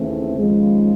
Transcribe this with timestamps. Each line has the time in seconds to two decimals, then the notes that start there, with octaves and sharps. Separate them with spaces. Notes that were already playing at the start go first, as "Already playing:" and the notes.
Already playing: D#2 C#3 E3 A3 C4
0.34 D#2 C#3 F3 G#3